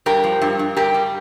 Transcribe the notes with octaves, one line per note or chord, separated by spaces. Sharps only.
G2 G4 A#4
F3
G2
G2
G2 G4 A#4
G3